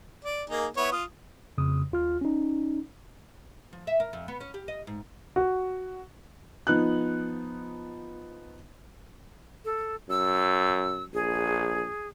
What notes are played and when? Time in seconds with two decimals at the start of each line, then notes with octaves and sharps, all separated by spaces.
0.25 D5
0.50 A#3 D#4 G#4
0.77 B3 E4 C#5
0.92 F4 D#6
1.58 F2 C#3 D#6
1.92 D#2 F4 F6
2.21 C#4 D#4
3.73 F3
3.87 E5
4.00 A#4
4.13 F2
4.28 B3
4.40 C#4
4.54 G4
4.68 D#5
4.87 G#2
5.36 F#4
6.67 F3 B3 D#4 F#6
9.65 A4
10.10 F#2 E6
11.14 A#1 G#4